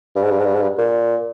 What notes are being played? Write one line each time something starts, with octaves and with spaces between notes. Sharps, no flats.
G2
G#2
G2
G#2
G2
G#2
G2
A#2